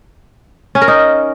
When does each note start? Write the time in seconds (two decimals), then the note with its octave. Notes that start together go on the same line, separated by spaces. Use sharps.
0.75 C#4
0.81 A#4
0.88 D#4